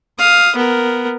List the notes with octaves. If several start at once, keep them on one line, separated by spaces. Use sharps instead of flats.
F5 D#6
B3 A#4